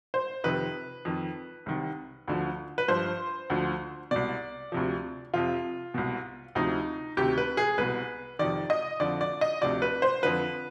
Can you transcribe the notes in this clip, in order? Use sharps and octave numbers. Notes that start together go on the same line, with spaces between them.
C5
F2 C3 D#3 B4
F2 D#3
C2 C3 D#3
D2 D3 F3
B4
G2 F3 C5
D2 D3 F3
C2 B2 D5
D2 C3 F3
F2 C3 F3 F4
C2 B2
D2 C3 F3 D#4
D2 C3 D#3 G4
B4
G#4
C2 B2 B4
F2 C3 D#3 D5
D#5
F2 D3 F3 D5
D5
D#5
D2 C3 F3 D5
B4
C5
F2 D3 F3 B4